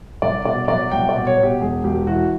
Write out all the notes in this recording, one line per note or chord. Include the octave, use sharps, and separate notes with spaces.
C2 D5
B2 D5
F#3 D5
C2 G5
D5
B2
C#5
B2
G4
E1 G#4
E1 G4
E3 F#4